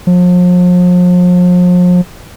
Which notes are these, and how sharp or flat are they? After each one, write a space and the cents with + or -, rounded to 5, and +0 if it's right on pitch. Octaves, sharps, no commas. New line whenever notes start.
F3 +40